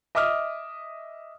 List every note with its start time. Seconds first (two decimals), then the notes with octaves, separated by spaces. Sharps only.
0.15 D#5 E5 D6 D#6 F6